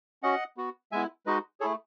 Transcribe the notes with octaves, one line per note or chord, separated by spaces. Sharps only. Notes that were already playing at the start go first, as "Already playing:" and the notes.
C#4 F#4 D#5 F#5
B3 F#4
G#3 B3 E4 E5 G#5
G#3 D#4 F#4 B4 D#5
A3 E4 G#4 A4 C#5